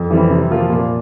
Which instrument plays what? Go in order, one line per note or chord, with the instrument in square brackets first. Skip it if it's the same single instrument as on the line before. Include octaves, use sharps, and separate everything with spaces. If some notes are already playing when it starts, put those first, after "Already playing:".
Already playing: [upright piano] F2
E3 G3 C4
C3
F3 A#3 F4
A#2